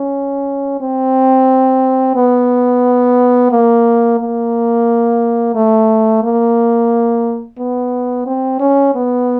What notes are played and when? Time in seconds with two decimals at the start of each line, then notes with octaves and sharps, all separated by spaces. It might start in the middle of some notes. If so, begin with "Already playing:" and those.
Already playing: C#4
0.80 C4
2.16 B3
3.51 A#3
4.20 A#3
5.55 A3
6.23 A#3
7.59 B3
8.26 C4
8.60 C#4
8.95 B3